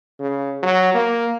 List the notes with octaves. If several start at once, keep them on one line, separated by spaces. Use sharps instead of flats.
C#3
F#3
A#3